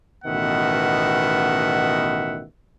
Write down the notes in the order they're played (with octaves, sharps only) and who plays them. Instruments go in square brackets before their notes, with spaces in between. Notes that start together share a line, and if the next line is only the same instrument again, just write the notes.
[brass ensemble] A1 B2 D#3 B3 E5 F#5